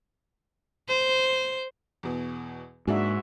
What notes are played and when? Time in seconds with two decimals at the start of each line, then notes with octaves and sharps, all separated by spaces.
0.88 C5
2.03 E2 B2
2.88 G#2 A#3 D4 F#4 G#4 E5